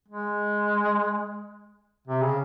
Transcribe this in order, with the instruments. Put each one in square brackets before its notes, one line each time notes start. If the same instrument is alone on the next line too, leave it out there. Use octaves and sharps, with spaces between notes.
[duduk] G#3
C3
C#3